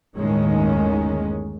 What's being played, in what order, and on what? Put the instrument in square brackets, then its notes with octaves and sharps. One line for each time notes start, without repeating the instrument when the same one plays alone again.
[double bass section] G1 D#2 A2 D#3 G#3 C#4